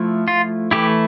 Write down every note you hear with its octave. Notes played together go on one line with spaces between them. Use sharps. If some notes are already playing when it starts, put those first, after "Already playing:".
Already playing: F3 A3 E4
F4
E3 A3 E4 G4